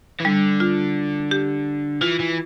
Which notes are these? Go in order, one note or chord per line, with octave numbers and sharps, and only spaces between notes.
E3
D3 G3
F4
G4
E3 F4
E3